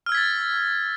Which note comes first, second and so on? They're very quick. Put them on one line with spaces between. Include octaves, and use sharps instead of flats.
F6 E6 G#6 B6 A6